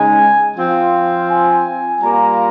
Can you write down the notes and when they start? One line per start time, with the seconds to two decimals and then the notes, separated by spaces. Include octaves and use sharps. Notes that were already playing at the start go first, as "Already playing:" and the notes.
Already playing: C#3 G#3 D#4 G#5
0.56 F3 C4 F4
1.29 G#5
2.02 G3 A#3 F4 A#5